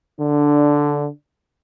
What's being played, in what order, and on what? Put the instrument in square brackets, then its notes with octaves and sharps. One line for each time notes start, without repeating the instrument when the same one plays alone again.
[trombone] D3 [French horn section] D4